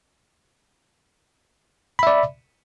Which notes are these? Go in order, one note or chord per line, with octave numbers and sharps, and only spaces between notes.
D5 E5 B5